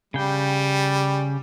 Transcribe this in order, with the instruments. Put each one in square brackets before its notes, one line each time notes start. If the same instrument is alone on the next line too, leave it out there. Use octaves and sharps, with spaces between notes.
[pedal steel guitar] C#3 G5 [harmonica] G3